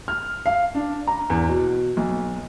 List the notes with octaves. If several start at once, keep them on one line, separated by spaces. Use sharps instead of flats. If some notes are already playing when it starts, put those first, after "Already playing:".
F6
F5
D4
A#5
E2
B2
B1